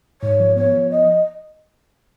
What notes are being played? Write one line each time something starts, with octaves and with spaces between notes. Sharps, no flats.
G#2 C#5
F3
B3 C#5
F3
D#5